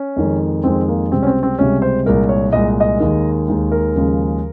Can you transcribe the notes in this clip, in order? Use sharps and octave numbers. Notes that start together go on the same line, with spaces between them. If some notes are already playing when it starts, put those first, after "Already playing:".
Already playing: C#4
F2 D#3 G#3
F2 D#3 G#3 C4
A#3
C#2 C3 G3 C4
C#4
C4
C4
C#2 C3 G3 C#4
C5
C2 A#2 G#3 A#4
C#5
C2 A#2 G#3 D#5
D#5
D#2 D#3 G#3
D#2 D#3 G#3
A#4
D#2 C#3 F3 G#3